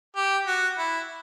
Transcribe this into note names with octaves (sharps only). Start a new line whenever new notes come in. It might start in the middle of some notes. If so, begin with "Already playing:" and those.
G4
F#4
E4